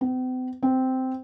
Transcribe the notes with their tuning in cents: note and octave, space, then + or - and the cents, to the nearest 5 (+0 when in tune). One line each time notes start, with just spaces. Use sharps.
C4 -45
C4 -10